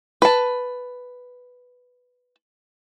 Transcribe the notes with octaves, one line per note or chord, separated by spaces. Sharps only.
B4 A5